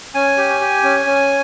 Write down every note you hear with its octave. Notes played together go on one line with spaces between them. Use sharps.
C#4 G#5
G4
G4
C#4
C#4